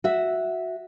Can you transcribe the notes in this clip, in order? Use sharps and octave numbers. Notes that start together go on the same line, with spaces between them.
F#4 E5